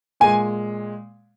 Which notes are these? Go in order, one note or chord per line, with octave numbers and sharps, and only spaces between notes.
A#2 G#3 G#5